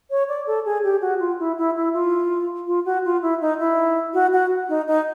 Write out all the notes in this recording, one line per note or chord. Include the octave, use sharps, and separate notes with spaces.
C#5
D5
A4
G#4
G4
F#4
F4
E4
E4
E4
F4
F4
F#4
F4
E4
D#4
E4
F#4
F#4
D#4
D#4